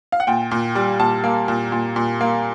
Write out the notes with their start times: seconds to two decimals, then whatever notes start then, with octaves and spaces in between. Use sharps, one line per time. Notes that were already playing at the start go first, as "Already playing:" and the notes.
0.12 F5
0.20 F#5
0.27 A#2 G5
0.51 A#2
0.75 G3
0.99 A#2 A5
1.24 A#3
1.48 A#2
1.72 A#2
1.96 A#2
2.21 A#3